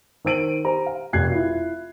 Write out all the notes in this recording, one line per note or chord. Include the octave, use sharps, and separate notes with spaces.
D#3 C5 E6 D7 D#7 F#7
G4 C5 A#5
F5
F1 F#4 F#6 G#6 C7
E4 F4